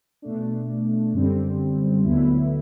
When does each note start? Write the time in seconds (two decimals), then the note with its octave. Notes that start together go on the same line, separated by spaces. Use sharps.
0.22 B2 A3 D4
1.14 F#2 D3 G3 C4
2.04 D2 D3 F#3 B3 E4